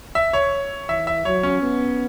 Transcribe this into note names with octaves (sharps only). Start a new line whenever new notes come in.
E5
C#5
E3 E5
E5
F#3 C#5
C#4
B3